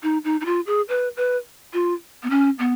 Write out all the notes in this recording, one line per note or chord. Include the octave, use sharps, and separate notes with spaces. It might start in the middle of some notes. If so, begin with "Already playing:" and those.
D#4
D#4
D#4
F4
G#4
B4
B4
F4
B3
C#4
B3